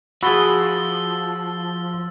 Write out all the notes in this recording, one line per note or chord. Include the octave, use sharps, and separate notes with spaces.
F3 F#4 G#4 B5 E6 A6 G7